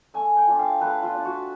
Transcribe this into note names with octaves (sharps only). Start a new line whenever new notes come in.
A3 G#5
G5
D4 F4
F5
A3 B4
F4
D4 F4
F#4